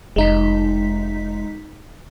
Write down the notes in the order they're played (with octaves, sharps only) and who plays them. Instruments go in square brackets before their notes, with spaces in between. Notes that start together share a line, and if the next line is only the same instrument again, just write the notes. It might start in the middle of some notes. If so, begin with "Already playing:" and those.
[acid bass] F1 [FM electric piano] G#3 D#4 B6